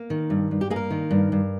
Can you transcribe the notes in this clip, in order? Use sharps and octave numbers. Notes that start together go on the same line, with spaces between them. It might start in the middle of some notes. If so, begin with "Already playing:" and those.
Already playing: A#3
D#3
G2
G2
G4
A#3 G#4
A#4
D#3
G2
G2